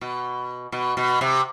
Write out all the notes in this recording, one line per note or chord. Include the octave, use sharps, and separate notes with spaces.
B2
B2
B2
C3